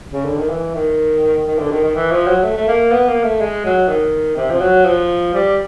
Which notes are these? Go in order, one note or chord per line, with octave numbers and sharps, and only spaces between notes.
C#3
D3
D#3
E3
D#3
D#3
D3
D#3
D#3
E3
F3
F#3
A3
A3
A#3
B3
A#3
A3
G#3
F#3
D#3
C3
F3
F#3
F3
G3